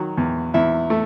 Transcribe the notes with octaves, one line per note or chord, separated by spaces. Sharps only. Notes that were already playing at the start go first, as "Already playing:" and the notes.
Already playing: D#3 F#3 F#4
E2
E2 E4 E5
A3